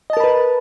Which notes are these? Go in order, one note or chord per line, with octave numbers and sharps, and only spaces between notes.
A#4 B4 D#5 A5 B5